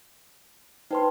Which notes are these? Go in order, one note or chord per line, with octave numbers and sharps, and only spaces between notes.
D#4 B4 C5 G5 A5 C6